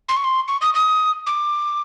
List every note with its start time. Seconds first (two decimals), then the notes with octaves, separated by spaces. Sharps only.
0.09 C6
0.17 C#6
0.24 C6
0.48 C#6
0.61 D#6
0.74 D#6
1.27 D6